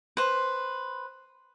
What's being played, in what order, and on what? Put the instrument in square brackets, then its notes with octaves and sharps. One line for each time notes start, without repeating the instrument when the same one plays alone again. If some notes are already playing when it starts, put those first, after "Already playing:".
[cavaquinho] B4 C5